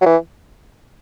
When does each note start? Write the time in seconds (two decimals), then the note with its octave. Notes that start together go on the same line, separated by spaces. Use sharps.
0.01 F#3
0.06 E3